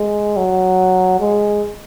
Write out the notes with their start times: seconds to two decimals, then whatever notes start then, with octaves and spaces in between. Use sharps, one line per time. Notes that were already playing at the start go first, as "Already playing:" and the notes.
Already playing: G#3
0.37 F#3
1.20 G#3